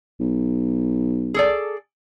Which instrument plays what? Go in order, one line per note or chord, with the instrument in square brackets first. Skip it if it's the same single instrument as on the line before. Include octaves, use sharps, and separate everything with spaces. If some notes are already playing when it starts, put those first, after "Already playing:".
[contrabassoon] B1
[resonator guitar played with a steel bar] G#4 A4 D5